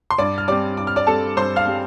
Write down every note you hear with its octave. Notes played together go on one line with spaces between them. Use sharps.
C6
G2 D5 D6
F6
G3 C4 D5 D6
G2 D6
F6
D5 D6
G3 C4 A4 A5
G2 C5 C6
F5 F6
G3 C4